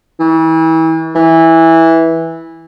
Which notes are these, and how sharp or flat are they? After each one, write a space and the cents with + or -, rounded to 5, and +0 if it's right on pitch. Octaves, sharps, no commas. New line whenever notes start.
E3 -35
E3 -10